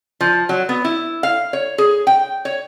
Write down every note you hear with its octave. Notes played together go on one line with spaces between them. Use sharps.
F3
F#3
B3
E4
F5
C#5
G#4
G5
C#5